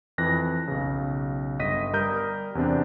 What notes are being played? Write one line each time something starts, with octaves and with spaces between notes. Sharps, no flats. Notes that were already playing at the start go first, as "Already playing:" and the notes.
F2 E3 F#6 A#6
B1 C#3
G1 D#5 A#6 B6 D#7
G3 A#4 D#6 G6
E2 C3 C4 D4